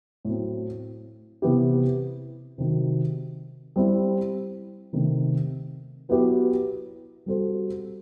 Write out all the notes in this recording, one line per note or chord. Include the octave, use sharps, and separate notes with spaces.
A2 F#3 C4
C3 E3 B3 E4 G4
C3 D#3 F#3
G3 C4 E4
C3 D#3 A3
F#3 B3 E4 G4 B4
G3 C4 F#4 A4 C5